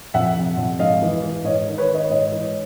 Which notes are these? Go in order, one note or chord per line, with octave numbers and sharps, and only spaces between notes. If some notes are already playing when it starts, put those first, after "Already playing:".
F2 E5 F#5
C3
F2
G#2 D#5 F5
E3
E3
G#2 C#5 D#5
D#3
B4 C#5
D#3
C#5 D#5
G#2 C#5 D#5
E3